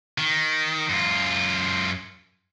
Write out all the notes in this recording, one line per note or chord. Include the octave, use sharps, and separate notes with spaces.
D#3
F#2 F4